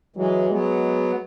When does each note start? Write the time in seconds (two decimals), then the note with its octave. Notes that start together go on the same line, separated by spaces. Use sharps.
0.16 E3 F#3 G#3
0.50 F#3 G#3 B3